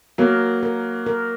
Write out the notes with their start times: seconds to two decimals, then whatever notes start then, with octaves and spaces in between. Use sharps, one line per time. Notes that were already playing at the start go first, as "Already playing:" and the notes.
0.18 F#3 A#3 A#4
0.63 A#4
1.06 A#4